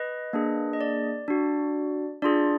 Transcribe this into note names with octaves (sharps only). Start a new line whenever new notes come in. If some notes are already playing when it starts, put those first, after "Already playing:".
Already playing: B4 D#5
A#3 D4 G#4
D#5
D5
D4 F#4
D4 F4 G#4 D5